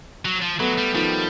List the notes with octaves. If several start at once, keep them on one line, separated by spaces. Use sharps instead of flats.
F#3
F3
F#3 A3 B3
G3
D#3 F3 G3